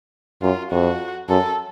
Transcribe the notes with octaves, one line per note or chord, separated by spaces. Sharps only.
F#2 F4
F2 F#4
F#2 A4